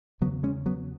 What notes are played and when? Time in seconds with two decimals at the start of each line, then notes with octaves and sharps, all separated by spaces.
0.21 E2 C#3 F#3 B3
0.43 G#3 C#4
0.66 F#3 B3